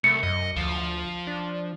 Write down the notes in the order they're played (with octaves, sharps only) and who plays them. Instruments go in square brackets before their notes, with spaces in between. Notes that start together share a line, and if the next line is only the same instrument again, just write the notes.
[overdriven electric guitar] C2 [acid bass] A3 [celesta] C#7
[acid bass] F#2 [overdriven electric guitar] D#5
[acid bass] D2 [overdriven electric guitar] F3
[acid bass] D4